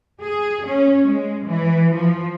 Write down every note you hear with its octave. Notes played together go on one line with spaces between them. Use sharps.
G#4
C#4
G#3
E3
F3